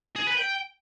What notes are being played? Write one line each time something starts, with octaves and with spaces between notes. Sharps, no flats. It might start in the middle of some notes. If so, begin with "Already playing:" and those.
G#4
B4
G5